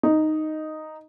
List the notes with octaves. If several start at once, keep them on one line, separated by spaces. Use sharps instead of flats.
D#4